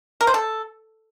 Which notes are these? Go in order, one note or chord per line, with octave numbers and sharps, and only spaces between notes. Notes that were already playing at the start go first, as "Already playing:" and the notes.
A#4
C5
A4